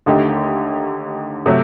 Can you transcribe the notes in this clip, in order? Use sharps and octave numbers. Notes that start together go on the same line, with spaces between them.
D#2 D3 A3 D#4 G4
C3 F#3 A3